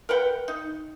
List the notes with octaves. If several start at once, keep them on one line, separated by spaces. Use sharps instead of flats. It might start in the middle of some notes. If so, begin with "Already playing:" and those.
A#4 B4 F#5 G5
D#4